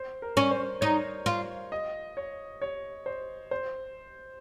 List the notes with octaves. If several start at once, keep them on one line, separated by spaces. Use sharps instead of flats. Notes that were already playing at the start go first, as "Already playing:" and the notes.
Already playing: C5
A#4
C#4
C5
D#4 C#5
F4
D#5
C#5
C#5
C5
C5